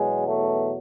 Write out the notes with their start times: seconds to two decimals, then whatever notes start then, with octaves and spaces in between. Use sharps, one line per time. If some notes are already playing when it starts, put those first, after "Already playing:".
Already playing: E2 B2 F#3 G#3
0.28 A3